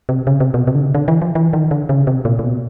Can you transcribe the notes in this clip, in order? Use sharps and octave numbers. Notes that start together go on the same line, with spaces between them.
C3
C#3
C3
B2
C3
D3
C#3
D3
E3
F3
E3
D#3
D3
C#3
C3
A#2
A#2
B2